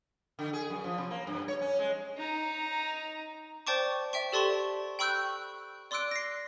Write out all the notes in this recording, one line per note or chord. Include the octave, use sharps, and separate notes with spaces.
D3
G#4
F#2
F3
C3
A#3
G2
C#5
C#4
G#3
D#4 A#5
C5 D5 G5 A5 C#6 D6
E5 G5 C#6
G4 A4 D5 A5 C6 C#6
G5 B5 C#6 E6 F#6 G6
D5 C6 D6 E6 F#6 D7
A#6 C7